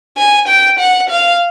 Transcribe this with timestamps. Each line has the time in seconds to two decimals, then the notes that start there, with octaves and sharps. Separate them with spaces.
0.17 G#5
0.48 G5
0.79 F#5
1.10 F5